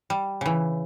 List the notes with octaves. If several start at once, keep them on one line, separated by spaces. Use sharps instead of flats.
G3
C#3 E3